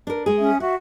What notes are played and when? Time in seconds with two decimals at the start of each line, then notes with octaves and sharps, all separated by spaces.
0.07 D4 A#4
0.26 G#3 G#4
0.38 C#4 E5 D#6
0.60 F#4 E5 F#5